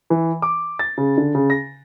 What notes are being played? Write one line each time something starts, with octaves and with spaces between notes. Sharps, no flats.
E3
D6
A6
C#3
D3
C#3
A#6